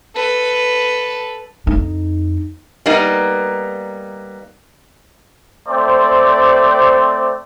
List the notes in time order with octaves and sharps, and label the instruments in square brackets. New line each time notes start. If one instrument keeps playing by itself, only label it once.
[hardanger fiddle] A4 B4
[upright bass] F2 D#4
[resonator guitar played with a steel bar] G3 A#3 B3 D#4
[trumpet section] A3 C4 C5 D5